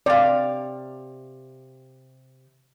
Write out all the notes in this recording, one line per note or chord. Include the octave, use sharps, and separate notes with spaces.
C3 D5 F5